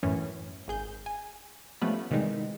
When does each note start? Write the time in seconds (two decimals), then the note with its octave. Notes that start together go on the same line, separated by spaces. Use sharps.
0.03 F#2 A2 E3 C#4
0.68 G#1 G#4 G6
1.06 G#5
1.81 F3 G3 A3 B3 C#4 B4
2.11 C3 D#3 E3 G3 G#3 D#4